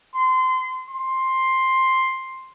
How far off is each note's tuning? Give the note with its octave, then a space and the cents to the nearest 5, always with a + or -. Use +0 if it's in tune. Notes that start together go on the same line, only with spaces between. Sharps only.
C6 -25
C6 +5